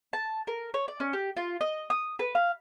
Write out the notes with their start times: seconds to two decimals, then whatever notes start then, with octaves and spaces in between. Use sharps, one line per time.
0.13 A5
0.47 A#4
0.74 C#5
0.88 D5
1.00 C#4
1.13 G4
1.37 F4
1.61 D#5
1.90 D#6
2.19 B4
2.35 F5